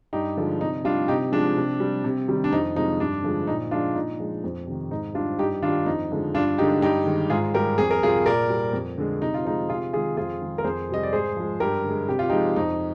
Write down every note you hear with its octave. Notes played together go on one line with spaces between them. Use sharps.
G2 D#4 G4
D3 F3 G#3
C3 D#4
G3 D4 F4
C3 D#4 G4
F3 G#3 D4
C3
G3
C3
D#3 G3
D4
F2 D#4
C3 F3 G#3 D#4
G2 D4
D3 F3 G#3
A#2 D#4
F3 G#3 D4 F4
A#2 D#4
F3 G#3
F2
C3 D#3
G#2 D#4
G3 D4 F4
G2 D#4 G4
D#3 G3 D4 F4
F2 D#4
D3 F3 G#3
G2 D4 F4
D3 G#3 D#4 G4
G2 D#4 G4
D#3 G#3
G#2 F4 G#4
G3 G4 A#4
F2 G#4
A#4
C3 G3 F4 G#4
A#2 A#4 D5
G3
F2
D3 G#3
C3 D#4
F4
F3 G#3 D#4
C3 F4 G#4
D#3 G#3 F4 G#4
F2 F4 G#4
D#3 G#3
A#4
F2 G#4 C5
C3 G3 D#5
D5
G#2 G#4 C5
F3 G#3
G2 G4 A#4
D3 G#3
C3 G4
F4
F3 G#3 D#4 G4
F2 D#4